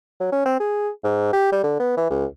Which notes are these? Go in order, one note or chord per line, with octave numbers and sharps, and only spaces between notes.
F#3
C#4
C4
G#4
G#2
G4
G3
D3
B3
E3
C#2